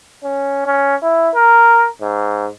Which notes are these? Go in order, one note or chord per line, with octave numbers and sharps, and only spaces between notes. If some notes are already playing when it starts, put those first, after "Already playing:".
C#4
C#4
E4
A#4
G#2